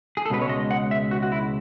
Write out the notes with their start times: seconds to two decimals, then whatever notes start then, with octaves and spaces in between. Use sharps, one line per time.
0.17 G#4
0.26 A4
0.30 C#2 B2 G#3 B4
0.42 C#5
0.49 D#5
0.71 F#5
0.91 E5
1.11 F#4
1.23 F#4
1.32 E4